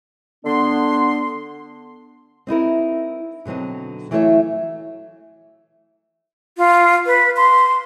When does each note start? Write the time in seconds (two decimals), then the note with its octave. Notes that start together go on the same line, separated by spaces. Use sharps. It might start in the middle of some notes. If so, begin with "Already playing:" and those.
0.45 D3 B3 D4 C6
2.47 C4 D#4 E4 A#4
3.45 B2 D3 F#3 C4 D#4
4.11 E3 F#3 A3 F4 C#5 E5
6.58 F4
7.06 B4
7.36 C6